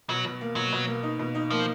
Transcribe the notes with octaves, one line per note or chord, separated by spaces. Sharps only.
B2 F#3
B2
A#3
B2 F#3
B2
A#3
D#4
B2
D#4
F3 A#3